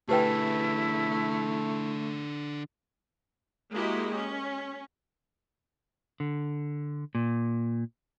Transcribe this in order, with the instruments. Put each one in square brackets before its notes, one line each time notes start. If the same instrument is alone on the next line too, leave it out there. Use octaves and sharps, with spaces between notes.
[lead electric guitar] D3 G#4 [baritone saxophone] A3 [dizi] E4 [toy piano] G4 B4 G5
[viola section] G#3 A#3 E4 F#4 G4 D#5
C#4
[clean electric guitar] D3
A#2